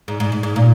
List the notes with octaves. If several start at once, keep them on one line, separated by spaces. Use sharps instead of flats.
G#2
G#2
G#2
G#2
A#2